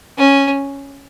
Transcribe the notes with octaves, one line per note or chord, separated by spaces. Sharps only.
C#4